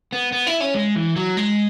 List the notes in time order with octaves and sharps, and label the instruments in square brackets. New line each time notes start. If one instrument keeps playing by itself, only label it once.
[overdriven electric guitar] B3
B3
E4
C#4
G#3
E3
F#3
G#3